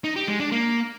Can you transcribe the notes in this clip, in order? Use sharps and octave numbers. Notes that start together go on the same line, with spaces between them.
D#4
G4
G#3
D4
A#3